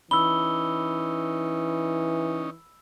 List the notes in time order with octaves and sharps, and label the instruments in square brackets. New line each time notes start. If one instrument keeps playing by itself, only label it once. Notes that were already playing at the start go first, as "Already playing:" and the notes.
[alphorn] E3 [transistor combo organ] C#4 D#4 [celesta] B5 [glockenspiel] E6 G7